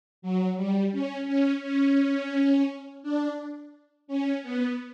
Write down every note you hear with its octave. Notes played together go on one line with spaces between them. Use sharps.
F#3
G3
C#4
C#4
C#4
D4
C#4
B3